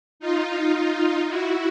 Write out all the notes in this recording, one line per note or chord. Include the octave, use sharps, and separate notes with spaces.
D#4 F4
E4 F#4